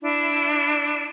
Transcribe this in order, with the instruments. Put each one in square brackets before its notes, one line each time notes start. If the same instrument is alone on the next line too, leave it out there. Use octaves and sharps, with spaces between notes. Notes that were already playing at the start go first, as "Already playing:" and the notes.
[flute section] D4 E4